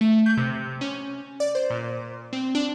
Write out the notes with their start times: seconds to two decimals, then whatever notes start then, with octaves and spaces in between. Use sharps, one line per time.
0.01 A3
0.26 G6
0.37 C3
0.81 C#4
1.40 D5
1.55 C5
1.70 A#2
2.33 C4
2.55 D4